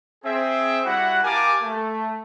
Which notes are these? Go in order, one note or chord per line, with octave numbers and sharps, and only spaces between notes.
C4 G#4 E5
G3 E4 F#4 F#5
G4 A#4 F5 G#5 A5 D6
A3